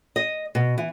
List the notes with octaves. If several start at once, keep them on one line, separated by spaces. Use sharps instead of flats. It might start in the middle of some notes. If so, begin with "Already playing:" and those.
D#5
B2
E3